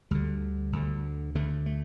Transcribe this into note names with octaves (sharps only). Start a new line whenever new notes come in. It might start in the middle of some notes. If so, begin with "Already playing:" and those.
D2 D3 G3
D2 D3
D2 D3 A3
A3